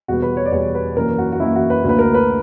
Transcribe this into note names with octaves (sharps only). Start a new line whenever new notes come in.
E2 B2 G3 B3 F#4
B4
C#5
D5
E2 B2 G3 B3 C#5
B4
F#2 E3 A#3 A#4
F#4
F#4
F#2 E3 A#3 E4
F#4
B4
D2 D3 A#3 B4
A#4
B4